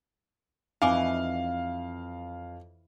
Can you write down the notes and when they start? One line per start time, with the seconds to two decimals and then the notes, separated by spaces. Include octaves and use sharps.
0.82 F2 E3 D#4 D#5 F5 G#5 C#6 D6